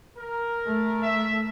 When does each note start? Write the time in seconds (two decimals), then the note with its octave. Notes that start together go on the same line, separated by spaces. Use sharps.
0.17 A#4
0.65 A3
1.03 E5